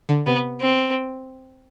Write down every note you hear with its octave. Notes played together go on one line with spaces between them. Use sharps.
D3
C3 B3
C4